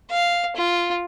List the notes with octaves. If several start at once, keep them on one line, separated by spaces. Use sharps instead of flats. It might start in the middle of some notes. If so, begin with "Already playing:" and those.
F5
F4